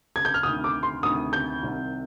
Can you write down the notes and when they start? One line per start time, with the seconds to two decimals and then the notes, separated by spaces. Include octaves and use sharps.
0.16 G#6
0.25 G6
0.34 F6
0.43 D2 C3 D#3 D#6
0.64 D6
0.83 C6
1.03 D2 C3 D#3 D#6
1.33 G6
1.63 C2 C3 D#3